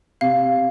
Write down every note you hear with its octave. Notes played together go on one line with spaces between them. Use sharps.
C3 F5